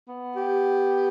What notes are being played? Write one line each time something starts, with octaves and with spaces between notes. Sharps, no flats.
B3
G4